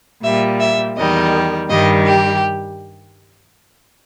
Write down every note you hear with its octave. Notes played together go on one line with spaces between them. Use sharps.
A#2 G3 E5
E5
E2 D#3 G3 D#5
G2 D#3 G3 D#5
G4